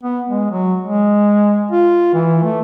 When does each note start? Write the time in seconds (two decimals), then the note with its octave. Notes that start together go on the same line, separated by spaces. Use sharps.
0.03 B3
0.29 G#3
0.51 F#3
0.81 G#3
1.71 F4
2.14 E3
2.43 A3